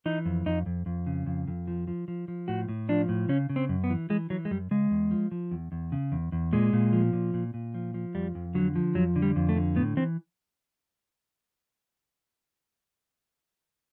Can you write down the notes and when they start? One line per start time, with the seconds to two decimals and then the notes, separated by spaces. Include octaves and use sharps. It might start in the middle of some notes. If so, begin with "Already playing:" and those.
0.06 E3 D#4
0.26 F2
0.46 F2 D#4
0.66 F2
0.86 F2
1.07 C#3
1.27 F2
1.48 F2
1.67 F3
1.88 F3
2.08 F3
2.28 F3
2.48 A2 F#4
2.69 A2
2.89 F3 D4
3.09 A2
3.29 C#3 C#4
3.50 C#3
3.56 C4
3.69 F#2
3.84 B3
3.90 E3
4.10 E3 G#3
4.30 E3 F#3
4.45 G#3
4.51 F#2 G3
4.71 C#3 G#3
4.91 E2
5.11 F3
5.31 F3
5.51 E2
5.72 E2
5.92 C#3
6.12 E2
6.32 E2
6.53 A#2 G#3
6.73 A#2
6.93 F3
7.13 A#2
7.34 A#2
7.54 A#2
7.74 F3
7.94 F3
8.15 F2 G3
8.35 F2
8.55 D3 F#3
8.76 F3
8.95 F2 F#3
9.16 D3
9.22 G3
9.36 F2
9.49 A3
9.56 D3
9.76 A2 B3
9.97 E3 C4